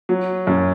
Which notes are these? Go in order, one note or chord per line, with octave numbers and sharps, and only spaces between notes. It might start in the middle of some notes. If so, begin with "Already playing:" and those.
F#3
F#2